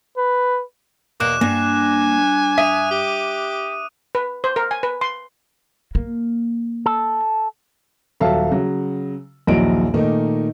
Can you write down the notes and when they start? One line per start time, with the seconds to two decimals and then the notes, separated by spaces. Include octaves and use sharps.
0.17 B4
1.20 E2 B2 A#3 D6 F#6 E7
1.41 G2 A#3 D4 G#5
2.58 E5 D#6 D#7
2.91 G4
4.15 B4
4.44 C5
4.56 A#4
4.71 G#5
4.83 B4
5.01 C6
5.95 A#3
6.86 A4
8.20 D#1 F#3 A4 E5 F5 A5
8.51 C#3 F#3
9.47 A#1 D#2 F#3 E4 D#5 D7
9.94 A#2 D#3 A3 A#3 D#4 A#4